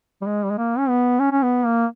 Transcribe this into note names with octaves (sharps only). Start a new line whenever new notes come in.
G3
G#3
G3
G#3
A#3
C#4
B3
C#4
C#4
B3
A#3